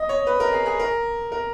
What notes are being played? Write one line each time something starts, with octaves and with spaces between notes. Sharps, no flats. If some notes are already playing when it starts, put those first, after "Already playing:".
Already playing: D#5
C#5
B4
A#4
G#4
G#4
A#4
A#4